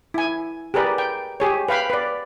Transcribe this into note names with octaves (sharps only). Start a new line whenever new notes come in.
E4 G#5
G4 G#4 A#4 B4 D5
G5
G4 G#4 C#5
B4 F5 G5 B5
B4 D5